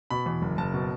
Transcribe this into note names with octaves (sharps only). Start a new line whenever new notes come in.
B2 B5
E2
F#1
F#1 A5
B2